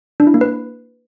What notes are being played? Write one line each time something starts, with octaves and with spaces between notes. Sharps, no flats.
D4
E4
A#3
B4